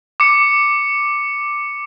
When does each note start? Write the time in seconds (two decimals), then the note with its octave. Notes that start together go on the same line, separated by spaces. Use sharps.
0.20 D6 C#7